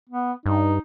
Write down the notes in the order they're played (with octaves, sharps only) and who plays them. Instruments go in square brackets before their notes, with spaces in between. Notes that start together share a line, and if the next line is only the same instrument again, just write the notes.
[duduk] B3
[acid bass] G2 [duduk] D#4